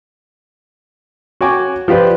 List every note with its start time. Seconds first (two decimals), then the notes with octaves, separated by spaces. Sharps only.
1.41 F#4 C#5 G5 G#5 D6
1.88 F3 F4 G4 B4 D5